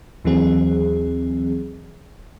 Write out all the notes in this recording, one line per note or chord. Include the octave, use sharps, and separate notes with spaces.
D#2 E3 F#3 C4 G#4